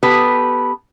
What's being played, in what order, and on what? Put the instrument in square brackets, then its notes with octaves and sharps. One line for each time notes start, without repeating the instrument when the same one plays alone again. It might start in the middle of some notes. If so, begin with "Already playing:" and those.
[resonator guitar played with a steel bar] B3 G4 A4 B4